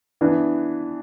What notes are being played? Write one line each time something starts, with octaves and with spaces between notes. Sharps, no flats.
E3 B3 D4